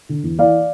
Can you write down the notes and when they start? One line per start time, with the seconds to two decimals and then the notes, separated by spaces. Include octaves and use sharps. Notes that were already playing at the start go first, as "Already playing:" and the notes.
0.09 D3
0.24 E2
0.39 E3 D5 F5